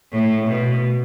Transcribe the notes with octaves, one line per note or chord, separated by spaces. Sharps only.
A2
B2